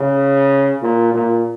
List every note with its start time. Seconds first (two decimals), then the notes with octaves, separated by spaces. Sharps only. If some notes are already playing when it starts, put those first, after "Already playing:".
Already playing: C#3
0.82 A#2
1.14 A#2